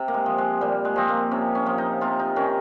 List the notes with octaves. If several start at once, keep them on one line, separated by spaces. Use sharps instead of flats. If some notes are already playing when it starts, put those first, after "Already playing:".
Already playing: C3
A#3
G#3
F3
G#3
A#2 G3
G#3
F3 C4
A#3
C3 C#4
C#4
F3
D#4
C3 F4
D#4
D#3 C#4